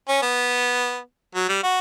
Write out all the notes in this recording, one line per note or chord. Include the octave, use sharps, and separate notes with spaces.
C#4
B3
F#3
G3
F#4